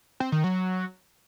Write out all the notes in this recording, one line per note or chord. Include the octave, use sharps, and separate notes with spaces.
C4
D#3
F#3